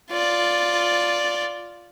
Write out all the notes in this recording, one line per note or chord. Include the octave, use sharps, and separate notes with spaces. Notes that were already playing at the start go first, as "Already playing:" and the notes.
F4 D5